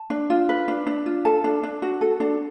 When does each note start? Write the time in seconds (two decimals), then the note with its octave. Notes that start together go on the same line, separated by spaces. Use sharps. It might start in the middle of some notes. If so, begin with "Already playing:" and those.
Already playing: A5
0.10 D4
0.30 F4
0.49 B4
0.68 D4
0.87 D4
1.06 F4
1.25 A4 A5
1.44 D4
1.63 D4
1.82 F#4
2.01 A4
2.20 D4